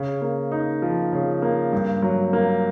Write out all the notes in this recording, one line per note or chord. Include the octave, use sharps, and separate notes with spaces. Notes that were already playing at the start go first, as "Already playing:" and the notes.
Already playing: C#3
A#3
D#4
F3
C#3
A#3
G2
F#3
A#3